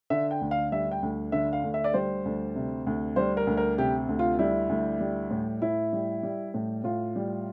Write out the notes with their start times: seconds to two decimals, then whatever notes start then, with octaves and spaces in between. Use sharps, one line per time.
0.10 D3 E5
0.31 G5
0.41 D2
0.51 F5
0.72 G3 E5
0.91 G5
1.02 D2
1.32 D3 E5
1.53 F5
1.63 D2
1.74 E5
1.84 D5
1.94 G3 C5
2.25 D2
2.55 C3
2.87 D2
3.16 G3 C5
3.37 A#4
3.47 D2
3.57 A#4
3.78 C3 G4
4.09 D2
4.19 F4
4.39 G3 E4
4.69 D2
5.00 G3
5.31 A2
5.62 A2 E4
5.93 G3
6.23 G3
6.54 A2
6.84 A2 F4
7.16 G3